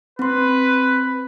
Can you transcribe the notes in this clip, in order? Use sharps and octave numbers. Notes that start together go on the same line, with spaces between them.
C4 B4 C6